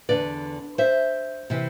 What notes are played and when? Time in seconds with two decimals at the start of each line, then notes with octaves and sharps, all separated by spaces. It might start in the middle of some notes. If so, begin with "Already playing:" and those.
0.09 E2 D3 B4 D5
0.78 C5 E5
1.50 C3 E3